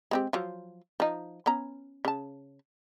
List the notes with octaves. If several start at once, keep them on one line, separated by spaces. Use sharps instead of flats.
G#3 C4 G4
F3 F#3 F4
F3 D#4
B3 C#4 A#5
C#3 A5